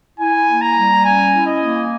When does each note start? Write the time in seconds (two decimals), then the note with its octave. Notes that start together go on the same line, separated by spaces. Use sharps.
0.19 E4 G#5
0.47 A#3
0.61 A#5
0.76 G3
1.05 C#4 G#5
1.33 E4
1.46 D#5
1.62 A#3